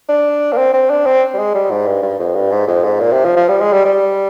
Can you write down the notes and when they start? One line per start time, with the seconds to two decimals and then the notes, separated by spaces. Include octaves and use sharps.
0.09 D4
0.52 A#3
0.57 C4
0.73 C4
0.90 D4
1.06 C4
1.34 G3
1.38 G#3
1.55 G3
1.71 G#2
1.86 G2
2.02 G2
2.19 F2
2.35 G2
2.52 G#2
2.67 F2
2.84 G#2
3.00 A#2
3.13 C3
3.25 F3
3.36 F3
3.48 G3
3.61 G#3
3.73 G3
3.85 G3